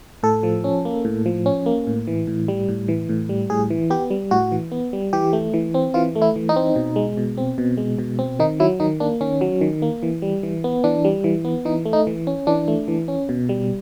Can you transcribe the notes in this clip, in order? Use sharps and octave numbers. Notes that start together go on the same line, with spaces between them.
A2 A4
F3
C#4
A#3
A2
F3
C#4
A#3
A2
E3
A2
G3
A2
E3
A2
G3
A2 G#4
E3
B3 G4
G3
A2 F#4
E3
B3
G3
E3 G4
A3
E3
C4
E3 F4
A3
E4
E3
D#4
C4
B2
G#3
B2
C4
B2
G#3
B2
C4
D#3 D#4
F#3 E4
D#3 D#4
A#3 D4
D#3 C#4
F#3
D#3
A#3
E3
G3
E3
B3
E3 D4
G3
E3
B3
E3 D#4
A3
D#4
E3
C#4
E3 D4
A3
E3
C#4
B2
G3